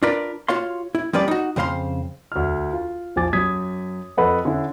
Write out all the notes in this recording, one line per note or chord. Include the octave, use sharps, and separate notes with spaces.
D4 F4 A#4 B4 D5
F4 F#4 C#5 F5 C6
E4
F3 G3 C#4 B4 C5 D5
D#4 F#4
F2 C#3 C5 F5 C6
D2 F6
F4
A#1 F3 G#5 D6 A6
F#2 D#6 G#6 B6
F2 A4 B4 D#5 F#5 B5
D3 C#4 D4 E4